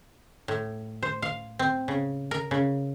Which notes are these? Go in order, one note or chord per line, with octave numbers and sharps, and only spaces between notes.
A2
C5
F5
C4
C#3
A#4
C#3